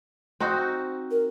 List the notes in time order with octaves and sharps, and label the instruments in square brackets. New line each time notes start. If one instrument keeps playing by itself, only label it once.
[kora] C4 D#4 F#4
[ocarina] A#4